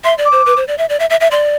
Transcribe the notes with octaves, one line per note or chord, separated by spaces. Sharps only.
E5 C6
D5
D6
C5
B4
C5
D5
E5
D5
E5
E5
E5
D5 C6